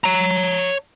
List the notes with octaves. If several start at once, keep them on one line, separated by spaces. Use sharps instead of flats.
C#5 A#5